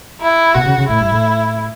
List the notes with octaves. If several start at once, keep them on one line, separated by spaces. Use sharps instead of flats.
E4
B2 F#4
C#3
C#3
A2 E4
G2
A2